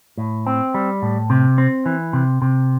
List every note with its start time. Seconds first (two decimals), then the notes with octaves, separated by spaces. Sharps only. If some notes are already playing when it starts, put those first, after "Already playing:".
0.18 A2
0.47 C4
0.74 G3
1.02 A2
1.30 C3
1.58 C4
1.86 E3
2.13 C3
2.42 C3